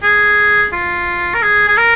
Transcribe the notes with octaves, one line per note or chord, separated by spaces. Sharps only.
G#4
F4
A#4
G#4
G#4
A#4